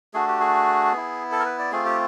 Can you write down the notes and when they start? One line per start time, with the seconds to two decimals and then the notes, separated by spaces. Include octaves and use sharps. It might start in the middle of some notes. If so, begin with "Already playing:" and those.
0.14 A3 D4 F#4 G#4
0.27 G4
0.40 G#4
0.93 B3 E4
1.32 A4
1.40 A#4
1.45 B4
1.59 D5
1.72 A3 C4 F4 G#4
1.85 G4